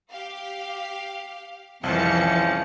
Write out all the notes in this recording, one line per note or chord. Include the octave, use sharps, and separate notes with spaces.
G4 F5
C2 F2 E3 F3 G#3 C#4 A5 C#7